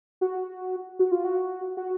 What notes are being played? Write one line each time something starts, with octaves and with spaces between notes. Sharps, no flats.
F#4
F#4
F4
F#4
F#4